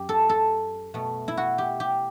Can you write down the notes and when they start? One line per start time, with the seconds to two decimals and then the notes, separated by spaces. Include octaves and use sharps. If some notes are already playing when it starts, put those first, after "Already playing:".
Already playing: F#2 G4
0.09 A4
0.29 A4
0.94 B2 A3
1.28 E4
1.37 F#4
1.58 G4
1.80 G4